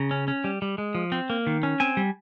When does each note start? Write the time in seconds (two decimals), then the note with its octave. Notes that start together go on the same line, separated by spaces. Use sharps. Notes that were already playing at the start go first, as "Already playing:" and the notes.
Already playing: C#3 A#5
0.11 C#4
0.28 C#4
0.44 G3
0.62 G3
0.78 G#3
0.95 F3
1.12 C4
1.30 A#3
1.47 D#3
1.63 C#4
1.80 C4 G#5
1.97 G3